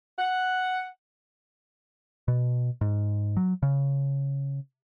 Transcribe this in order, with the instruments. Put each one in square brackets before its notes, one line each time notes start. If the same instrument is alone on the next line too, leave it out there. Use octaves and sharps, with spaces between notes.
[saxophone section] F#5
[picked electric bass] B2
G#2
F#3
C#3